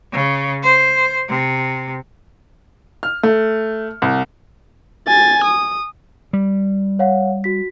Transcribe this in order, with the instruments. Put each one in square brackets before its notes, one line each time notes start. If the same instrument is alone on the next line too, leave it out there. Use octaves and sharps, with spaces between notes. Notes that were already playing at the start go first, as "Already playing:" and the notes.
[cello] C#3
C5
C3
[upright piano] F6
A3
C2
[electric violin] G#5 A6
D#6
[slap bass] G3
[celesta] C#5 F5 F#5
F#4 B6